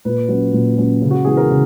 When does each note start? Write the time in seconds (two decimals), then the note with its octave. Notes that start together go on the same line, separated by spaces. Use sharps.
0.05 A#2 B4
0.28 F#3 C#4
0.53 A#2
0.78 F#3 C#4
1.02 C#3
1.11 F#4
1.25 E3 B3 G#4
1.37 A#4
1.50 C#3